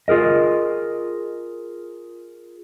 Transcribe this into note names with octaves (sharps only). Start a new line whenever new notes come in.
F4 G#4 A#4 D#5